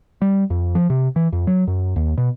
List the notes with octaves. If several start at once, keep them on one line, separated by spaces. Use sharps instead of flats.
G3
F2
F3
C3
E3
F2
F#3
F#2
D#2
B2